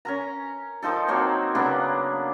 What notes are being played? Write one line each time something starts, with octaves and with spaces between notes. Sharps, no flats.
C#4 A#4 A#5
D#3 F3 D#4 A4
F#3 A#3 C4 C#5
C#3 A#3 B3 D4